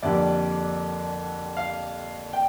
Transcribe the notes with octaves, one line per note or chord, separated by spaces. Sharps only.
F2 D3 G3 A#3 D5
F5
G5